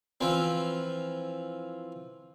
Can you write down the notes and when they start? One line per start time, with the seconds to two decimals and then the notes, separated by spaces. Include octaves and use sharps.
0.21 E3 F3 C4